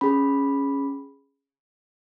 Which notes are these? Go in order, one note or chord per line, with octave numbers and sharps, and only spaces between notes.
C#4 G#4 B5